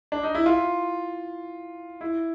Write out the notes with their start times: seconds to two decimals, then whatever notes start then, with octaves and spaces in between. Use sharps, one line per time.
0.12 D4
0.23 D#4
0.35 E4
0.46 F4
2.01 E4